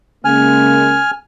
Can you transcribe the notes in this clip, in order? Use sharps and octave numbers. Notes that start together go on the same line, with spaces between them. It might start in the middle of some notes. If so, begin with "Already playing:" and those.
C#3 G#3 A#3 G#5 F6